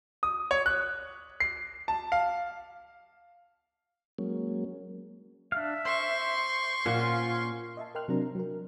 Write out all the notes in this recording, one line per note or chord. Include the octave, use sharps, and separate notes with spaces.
D#6
C#5
F#6
C7
A5
F5
F#3 G#3 A#3 C#4
D4 E5 F5
C5 C6 C#6
A#2 C#4 F4 C5 F#5
D#5 E5 A5
A#4 D#5 G5 C6 F6 F#6
C3 F#3 C4 D4 A#4 A#5
F#3 A#4